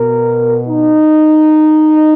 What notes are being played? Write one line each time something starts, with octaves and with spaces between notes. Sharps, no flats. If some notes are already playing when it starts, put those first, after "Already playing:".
Already playing: B2 A#4
D#4